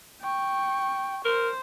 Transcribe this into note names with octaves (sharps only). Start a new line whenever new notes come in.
G5 C#6
A#4 C5